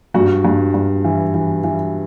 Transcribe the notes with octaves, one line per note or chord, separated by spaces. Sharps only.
G2 F#4
G2
G2
E3
E3
E3